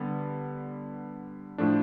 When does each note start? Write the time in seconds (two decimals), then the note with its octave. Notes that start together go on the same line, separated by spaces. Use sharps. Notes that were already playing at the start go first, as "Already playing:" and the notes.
Already playing: D3 G3 B3
1.58 A2 F3 A3 D4